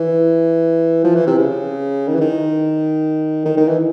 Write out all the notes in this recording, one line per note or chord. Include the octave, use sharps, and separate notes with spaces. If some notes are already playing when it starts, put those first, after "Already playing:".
Already playing: E3
F3
E3
C3
C#3
D#3
E3
D#3
D#3
D#3
E3